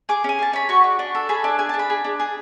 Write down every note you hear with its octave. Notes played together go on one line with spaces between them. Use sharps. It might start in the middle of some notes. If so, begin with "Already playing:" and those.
G#4 D6
C#4 G#5
G#4 A5
C#4 B5
F#4 C#6
D4
D4
A4
G#4 B5
D4 A5
G#4 G#5
A5
D4
B5
G#4
D4
G#4